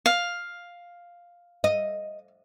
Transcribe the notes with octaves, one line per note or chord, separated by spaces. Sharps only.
F5
D#5